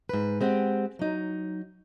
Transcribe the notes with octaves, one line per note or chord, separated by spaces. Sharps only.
G#2 B4
G#3 C4 G4 F#5
F#3 D#4